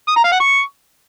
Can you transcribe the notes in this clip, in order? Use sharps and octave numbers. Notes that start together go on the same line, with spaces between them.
D#6
A#5
F5
F#5
C#6